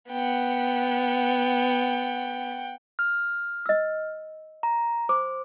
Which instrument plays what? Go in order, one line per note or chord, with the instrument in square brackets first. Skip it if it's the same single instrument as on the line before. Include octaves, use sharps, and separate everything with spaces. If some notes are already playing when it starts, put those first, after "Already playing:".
[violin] B3 [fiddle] F#5 G5
[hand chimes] F6
[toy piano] D#5 E6
[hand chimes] A#5
[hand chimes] C5 [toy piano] D6